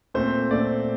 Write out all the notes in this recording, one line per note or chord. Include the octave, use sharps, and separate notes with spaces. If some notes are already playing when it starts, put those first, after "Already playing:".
A#2 A3 C4 C5
A#2 A3 C4 D5